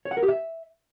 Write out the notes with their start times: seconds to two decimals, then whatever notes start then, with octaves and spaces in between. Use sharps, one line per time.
0.05 C#5
0.11 F#5
0.17 A#4
0.23 G4
0.28 E5